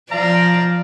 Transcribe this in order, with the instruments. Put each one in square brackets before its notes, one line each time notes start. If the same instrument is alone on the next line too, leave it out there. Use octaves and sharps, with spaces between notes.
[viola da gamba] F3 D5 [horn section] F5 A#5